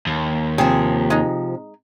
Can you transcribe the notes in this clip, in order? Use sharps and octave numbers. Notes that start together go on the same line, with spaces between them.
D#2
C3 F3 G#4
G#3 D#4